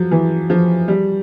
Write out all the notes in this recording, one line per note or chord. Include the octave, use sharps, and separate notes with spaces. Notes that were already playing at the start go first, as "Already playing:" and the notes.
Already playing: F3 F#3
E3
F3
G3